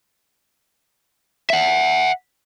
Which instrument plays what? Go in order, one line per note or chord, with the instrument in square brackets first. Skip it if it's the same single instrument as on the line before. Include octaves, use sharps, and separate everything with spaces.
[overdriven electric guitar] E5 F#5